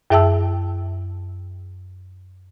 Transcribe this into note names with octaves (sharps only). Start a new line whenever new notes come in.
F#2 G#4 E5 G5 A5 E6